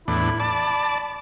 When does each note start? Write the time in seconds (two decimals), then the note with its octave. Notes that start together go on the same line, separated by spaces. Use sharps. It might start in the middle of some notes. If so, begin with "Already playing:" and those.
0.08 E2 A2 D4 E4
0.40 D5 A5 B5